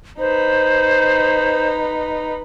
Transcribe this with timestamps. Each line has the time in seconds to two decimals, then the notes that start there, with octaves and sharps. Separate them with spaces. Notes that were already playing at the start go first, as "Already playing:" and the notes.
0.19 D#4 B4 C5